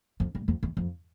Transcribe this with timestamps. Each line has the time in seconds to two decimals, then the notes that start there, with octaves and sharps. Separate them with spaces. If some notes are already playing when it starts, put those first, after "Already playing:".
0.20 F2
0.35 G2
0.48 F2
0.63 E2
0.77 F2